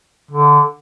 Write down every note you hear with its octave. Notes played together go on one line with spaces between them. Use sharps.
D3